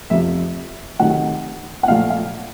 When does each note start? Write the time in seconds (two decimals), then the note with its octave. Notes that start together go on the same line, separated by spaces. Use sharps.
0.10 F2 C3 F3 E5
0.99 C3 D#3 F#3 A3 F#5
1.83 F#5
1.88 A#2 F3 A3 F5
2.10 F5